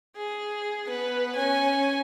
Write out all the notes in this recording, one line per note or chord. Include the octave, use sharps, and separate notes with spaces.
G#4
B3 B4
C#4 G#5